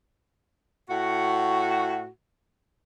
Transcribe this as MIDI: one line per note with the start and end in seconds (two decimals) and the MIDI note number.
0.89 2.08 45
0.89 2.08 66